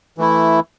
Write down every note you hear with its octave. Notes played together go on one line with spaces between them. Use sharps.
E3 A3 E4